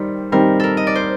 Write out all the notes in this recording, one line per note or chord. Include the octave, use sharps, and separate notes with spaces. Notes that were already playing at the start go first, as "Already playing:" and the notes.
Already playing: D#3 G3 A#4 C5 D5
D#3 G3 C4 A#4
A4 A#4
D#5
D5
C5